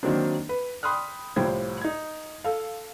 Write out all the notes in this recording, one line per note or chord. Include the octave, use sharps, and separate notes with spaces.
D#3 F#3 A#3 C4 D4
B4
G5 B5 C6 D#6 F6 F#6
C2 A2 F3 G4 C5 G#6
D#4 G#6
A4 F5